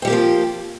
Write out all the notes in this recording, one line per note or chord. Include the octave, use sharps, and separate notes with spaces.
F3 G3 A#3 C4 G4